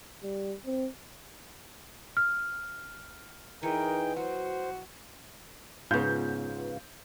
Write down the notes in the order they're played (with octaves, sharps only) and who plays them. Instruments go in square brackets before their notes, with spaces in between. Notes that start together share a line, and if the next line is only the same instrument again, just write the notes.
[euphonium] G3
C4
[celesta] F6
[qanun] E3 B4 C#5 [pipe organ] D#4 G#4 G5 [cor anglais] A#4
[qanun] F#3 [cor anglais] F#4 [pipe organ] C5
[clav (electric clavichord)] G#2 C#3 [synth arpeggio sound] B3 F4 [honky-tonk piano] G6